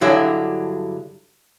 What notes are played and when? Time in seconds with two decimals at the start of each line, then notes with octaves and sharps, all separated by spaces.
0.01 G2 D3 F#3 E4 G#4